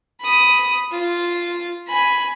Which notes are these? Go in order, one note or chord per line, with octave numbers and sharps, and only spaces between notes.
B5 D#6
F4
G#5 B5